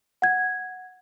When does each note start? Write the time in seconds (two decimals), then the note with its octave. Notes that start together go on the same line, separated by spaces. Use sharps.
0.22 F#5 G#6